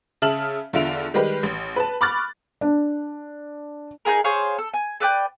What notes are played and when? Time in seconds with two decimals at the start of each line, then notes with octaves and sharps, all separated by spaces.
0.22 C#3 E5 A5 F6 F#7
0.73 E2 D3 F4 E5 D7 F7
1.14 D#3 G3 G#3 G4 B4
1.43 A1
1.76 B4 A5
2.01 B5 C#6 D6 F6 F#6 A6
2.61 D4
4.05 D#4 F4 G#4 A#4
4.24 G#4 C5 C#5 F5
4.58 A4
4.74 G#5
5.00 A4 B4 D5 G5